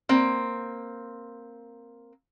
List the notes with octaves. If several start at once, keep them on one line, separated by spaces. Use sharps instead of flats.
A#3 C4